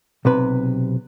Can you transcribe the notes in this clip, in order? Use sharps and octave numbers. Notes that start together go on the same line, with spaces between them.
B1 C3 B4